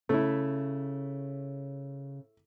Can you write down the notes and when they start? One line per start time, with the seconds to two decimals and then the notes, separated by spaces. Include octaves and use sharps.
0.09 C#3 A3 E4